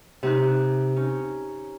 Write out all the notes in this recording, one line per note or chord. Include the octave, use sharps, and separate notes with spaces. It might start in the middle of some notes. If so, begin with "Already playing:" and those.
C3 D#4 F#6
C#4 D#4